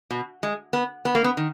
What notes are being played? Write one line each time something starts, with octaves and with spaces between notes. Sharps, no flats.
B2
G#3
B3
B3
A#3
B3
D#3